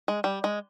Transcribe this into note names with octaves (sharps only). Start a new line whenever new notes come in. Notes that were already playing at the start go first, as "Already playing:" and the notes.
G#3
G3
G#3